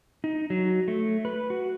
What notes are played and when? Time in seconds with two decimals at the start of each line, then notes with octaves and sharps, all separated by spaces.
0.24 D#4
0.50 F#3
0.88 A3
1.25 B4
1.50 F#4